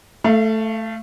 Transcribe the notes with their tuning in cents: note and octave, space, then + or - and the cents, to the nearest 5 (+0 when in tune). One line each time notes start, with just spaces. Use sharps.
A3 +0 F5 -35